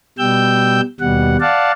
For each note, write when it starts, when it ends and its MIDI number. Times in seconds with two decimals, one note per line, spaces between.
0.18 0.81 47
0.18 0.81 55
0.18 0.81 79
0.18 0.81 88
0.18 0.81 91
1.00 1.37 39
1.00 1.37 47
1.00 1.37 55
1.00 1.37 78
1.40 1.72 74
1.40 1.72 77
1.40 1.72 78
1.40 1.72 81